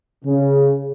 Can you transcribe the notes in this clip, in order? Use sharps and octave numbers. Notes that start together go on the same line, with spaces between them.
C#3